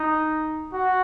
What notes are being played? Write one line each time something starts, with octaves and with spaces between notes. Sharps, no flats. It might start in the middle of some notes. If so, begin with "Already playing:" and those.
Already playing: D#4
F#4